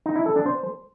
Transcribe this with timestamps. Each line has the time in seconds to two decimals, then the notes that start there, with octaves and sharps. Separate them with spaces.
0.06 D#4
0.16 E4
0.26 A4
0.36 D4
0.46 C5